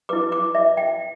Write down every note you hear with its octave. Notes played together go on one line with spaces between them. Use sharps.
E4 B4 D6
D6
E5
G5